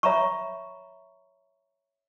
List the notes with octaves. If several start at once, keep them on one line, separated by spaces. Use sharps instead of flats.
C#5 E5 A#5 B5 C#6